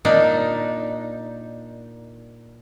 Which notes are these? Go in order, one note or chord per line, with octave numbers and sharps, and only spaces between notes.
A#2 D4 D#4